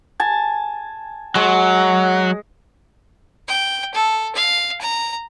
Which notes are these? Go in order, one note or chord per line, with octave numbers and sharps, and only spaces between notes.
G#5 A5
F#3 G#3 F#5
G5
A4
F5
A#5